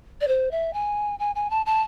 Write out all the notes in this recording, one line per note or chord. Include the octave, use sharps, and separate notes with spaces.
D5
C5
E5
G#5
G#5
G#5
A5
A5